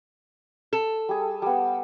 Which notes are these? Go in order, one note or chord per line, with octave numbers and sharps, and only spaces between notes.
A4
G3 G#4
G3 B3